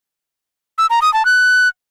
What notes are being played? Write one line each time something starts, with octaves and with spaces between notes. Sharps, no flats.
E6
A#5
D#6
A5
F#6